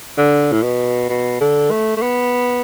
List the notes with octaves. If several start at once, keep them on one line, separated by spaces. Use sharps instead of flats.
D3
A2
B2
B2
D3
A3
A3
B3